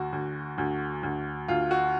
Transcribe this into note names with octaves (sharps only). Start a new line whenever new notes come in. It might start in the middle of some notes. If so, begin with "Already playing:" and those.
Already playing: D2 F#4
D2
D2
D2
D2 F4
F#4